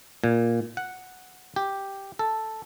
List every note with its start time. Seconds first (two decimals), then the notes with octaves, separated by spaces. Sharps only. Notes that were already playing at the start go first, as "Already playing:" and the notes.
0.24 A#2
0.77 F#5
1.56 G4
2.19 A4